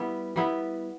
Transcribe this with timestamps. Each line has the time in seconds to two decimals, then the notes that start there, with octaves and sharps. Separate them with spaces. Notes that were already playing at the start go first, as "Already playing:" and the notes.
Already playing: G3 B3 E4
0.36 G3 B3 E4